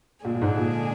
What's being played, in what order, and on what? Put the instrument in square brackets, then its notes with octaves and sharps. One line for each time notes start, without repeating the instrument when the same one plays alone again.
[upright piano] A#2 [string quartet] D3 G#3 D4 G#4
[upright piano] A#2
G#2
A#2